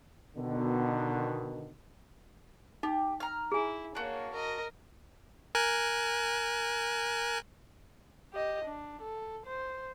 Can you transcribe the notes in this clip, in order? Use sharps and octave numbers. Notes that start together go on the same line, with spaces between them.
B2 D3 D#3
D#4 G4
A#5 F6
E4 G#4 G#5
A#3 D4 F#4 C#5
A#4 D#5
A#4 G#5 F#6
G4 D#5
D4
A4
C5